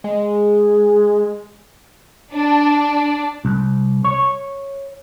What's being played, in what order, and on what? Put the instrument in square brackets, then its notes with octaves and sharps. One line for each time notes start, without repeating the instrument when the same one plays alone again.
[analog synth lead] G#3
[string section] D4
[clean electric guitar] C2
C#5